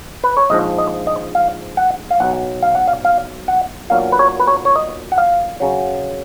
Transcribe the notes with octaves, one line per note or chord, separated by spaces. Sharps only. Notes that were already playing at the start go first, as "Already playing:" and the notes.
B4
C#5
A#1 G#2 F3 D#5
D#5
D#5
F5
F#5
F5
B1 B2 F#3 F#5
F5
F#5
F5
F5
F#5
B1 A#2 F#3 F5
B4
C#5
B4
C#5
C#5
D#5
F#5
F5
F#2 C#3 F#3